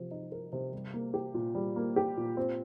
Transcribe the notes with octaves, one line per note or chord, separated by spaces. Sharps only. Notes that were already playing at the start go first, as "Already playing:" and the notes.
Already playing: C3 F3
D#4
A#4
C3
G3
A#3
G4
A#2
G3
A#3
G4
A#2
C4